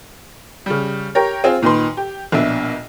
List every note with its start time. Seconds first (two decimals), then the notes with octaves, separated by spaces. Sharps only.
0.66 C#3 G3
1.15 G4 A#4 C#5
1.44 C4 F4 G#4
1.62 A#2 D#3 B4 C6
1.97 G4
2.32 A#1 B2 D4 E5